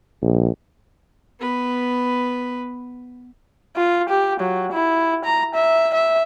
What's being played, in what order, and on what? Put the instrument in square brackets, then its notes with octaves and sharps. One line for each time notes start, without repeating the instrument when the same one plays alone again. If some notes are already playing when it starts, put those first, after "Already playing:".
[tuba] A#1
[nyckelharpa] B3 B4
[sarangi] F4
G4
F#3
E4
A#5
E5
E5